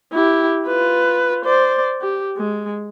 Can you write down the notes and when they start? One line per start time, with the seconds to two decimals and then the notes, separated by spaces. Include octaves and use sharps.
0.13 E4 G4
0.67 F4 B4
1.45 C5 D5
2.01 G4
2.37 G#3